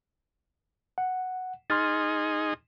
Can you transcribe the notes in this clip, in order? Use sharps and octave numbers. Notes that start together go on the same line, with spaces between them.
F#5
D#4 G#4 C6 F6 A6